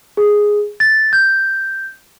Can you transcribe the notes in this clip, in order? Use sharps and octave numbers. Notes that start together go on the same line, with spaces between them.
G#4
A6
G6